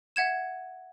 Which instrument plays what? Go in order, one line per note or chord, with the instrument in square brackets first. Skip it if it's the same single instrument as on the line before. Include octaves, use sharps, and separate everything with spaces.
[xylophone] E5 F#5 G#6 E7